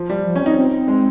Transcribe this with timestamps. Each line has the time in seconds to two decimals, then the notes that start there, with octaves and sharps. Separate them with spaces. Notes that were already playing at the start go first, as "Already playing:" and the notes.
Already playing: F3
0.09 G3
0.25 F3
0.35 C#4
0.41 C4 D#4
0.57 C4
0.78 C4
0.88 G#3